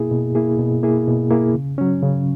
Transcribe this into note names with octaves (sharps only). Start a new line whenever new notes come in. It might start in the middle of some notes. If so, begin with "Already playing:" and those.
Already playing: B2 A#3 E4 G#4
B2
A#3 E4 G#4
B2
A#3 E4 G#4
B2
A#3 E4 G#4
C#3
F#3 C#4
C#3